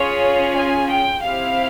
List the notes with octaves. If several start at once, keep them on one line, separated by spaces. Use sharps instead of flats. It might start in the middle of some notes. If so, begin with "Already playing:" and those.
Already playing: C#4 F4 G#4 C#5
G#5
G5
C4 E4 G4 F5